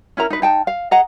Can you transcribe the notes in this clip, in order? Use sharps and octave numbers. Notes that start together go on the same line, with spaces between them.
C#4 E4 A#4 A#5
D#4 B4
D#4 G5 A5
F5
G#4 D#5 F#5 A#5